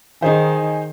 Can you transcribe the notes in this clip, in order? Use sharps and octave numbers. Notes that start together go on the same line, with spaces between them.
D#3 D#4 G#4 C5 G#5